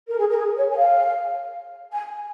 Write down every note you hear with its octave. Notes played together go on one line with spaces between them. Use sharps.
A#4
G#4
A#4
G#4
C#5
G#5
F5
G#5